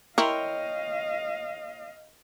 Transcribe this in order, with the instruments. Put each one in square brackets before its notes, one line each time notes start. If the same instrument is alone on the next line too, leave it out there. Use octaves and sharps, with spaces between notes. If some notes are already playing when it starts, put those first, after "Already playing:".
[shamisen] E4 A#4 [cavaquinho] C#5 G5 C6 [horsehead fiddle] D#5 F5